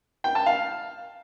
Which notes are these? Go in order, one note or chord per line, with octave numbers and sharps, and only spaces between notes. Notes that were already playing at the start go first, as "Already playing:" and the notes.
G5
A5
F5